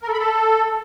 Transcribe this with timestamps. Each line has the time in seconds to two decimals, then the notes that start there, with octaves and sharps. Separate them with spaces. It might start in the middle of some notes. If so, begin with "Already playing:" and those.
0.03 A#4
0.08 A4
0.13 B5
0.19 A4